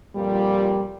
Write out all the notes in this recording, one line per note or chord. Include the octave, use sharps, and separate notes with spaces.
F2 A#2 G3